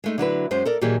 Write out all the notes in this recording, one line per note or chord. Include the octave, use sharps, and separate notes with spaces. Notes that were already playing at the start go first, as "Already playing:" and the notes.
G#3 A3 D#4
D3 F#3 E4 B4
F#2 G#3 C5
A4 A#4 D5
A#2 D#3 E3 F#3 G4 G#4